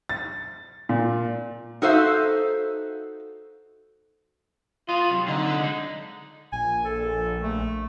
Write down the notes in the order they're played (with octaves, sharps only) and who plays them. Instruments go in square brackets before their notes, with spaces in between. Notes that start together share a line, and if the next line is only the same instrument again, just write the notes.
[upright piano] A6
A#2
[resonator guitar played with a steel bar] D#4 F#4 A4 C5 E5 F5
[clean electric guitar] B3 D#5 [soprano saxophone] F4
[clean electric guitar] C3 F#3
[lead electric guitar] D3 [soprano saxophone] D#4
[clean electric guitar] F#3 B4
G#3 D#4
[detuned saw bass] A#1 [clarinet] G#5
[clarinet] A4
A3